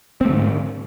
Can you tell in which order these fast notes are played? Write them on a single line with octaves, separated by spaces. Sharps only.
C4 A3 D3 G#2